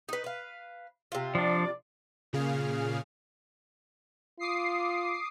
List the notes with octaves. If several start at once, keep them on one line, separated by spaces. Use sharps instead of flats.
D#4 B4
B4 F5
C3 F4
F3 D4 D5
A#2 C#3 G#4 F5 F6
F4 D6 D#6 C7